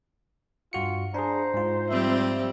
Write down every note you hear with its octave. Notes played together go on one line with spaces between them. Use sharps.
G2 F4 F#4 C#7
D4 G#4 C5 A#5
G#2 F4
F3 G3 C4 E5